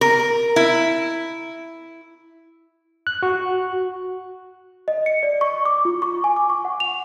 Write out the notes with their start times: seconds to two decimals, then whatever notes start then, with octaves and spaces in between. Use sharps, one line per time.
0.01 A#4
0.56 E4
3.07 F#6
3.23 F#4
4.88 D#5
5.06 C#7
5.23 D5
5.41 C#6
5.66 D6
5.85 F4
6.02 C#6
6.24 G#5
6.36 D6
6.50 C#6
6.65 F#5
6.80 F7